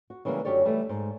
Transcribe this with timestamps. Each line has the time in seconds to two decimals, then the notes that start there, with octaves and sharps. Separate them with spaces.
0.10 F#4
0.25 C#3 E3 G3 G#3 A#3 B3
0.45 F#2 D3 F#3 G4 C#5 D5
0.65 E3 G3 A3
0.89 G#2